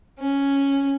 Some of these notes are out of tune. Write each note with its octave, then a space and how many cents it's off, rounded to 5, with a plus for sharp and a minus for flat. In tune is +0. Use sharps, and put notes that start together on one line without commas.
C#4 +0